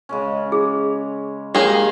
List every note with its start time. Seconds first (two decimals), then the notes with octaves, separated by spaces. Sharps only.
0.09 C#3 G#3 C#4
0.52 G#4
1.55 G#3 A#3 F4 G4 G#4 C#5 F5